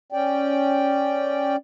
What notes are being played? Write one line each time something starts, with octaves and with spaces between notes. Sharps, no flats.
C#4 D5 G5